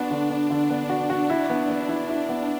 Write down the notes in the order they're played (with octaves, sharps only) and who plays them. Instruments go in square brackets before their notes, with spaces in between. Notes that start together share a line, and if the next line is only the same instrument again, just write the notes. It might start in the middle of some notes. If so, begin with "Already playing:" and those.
Already playing: [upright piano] B3 F#4 [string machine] D4
[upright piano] D3 [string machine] D4
[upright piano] B3
D3
B3
F#4
F#4
[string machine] D4 [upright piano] E4
[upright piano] B3
B3
E4
[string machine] D4 [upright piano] E4
[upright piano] B3